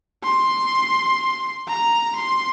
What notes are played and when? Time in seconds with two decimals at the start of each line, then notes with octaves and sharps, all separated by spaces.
0.23 C6
1.68 A#5
2.16 C6